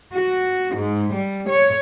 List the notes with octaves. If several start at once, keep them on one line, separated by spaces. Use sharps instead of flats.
F#4
G#2
G3
C#5